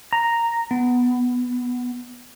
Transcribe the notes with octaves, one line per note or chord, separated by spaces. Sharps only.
A#5
B3